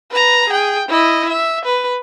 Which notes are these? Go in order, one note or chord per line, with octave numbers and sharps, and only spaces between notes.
B4 A#5
G#4 G5
E4 D#5
E5
B4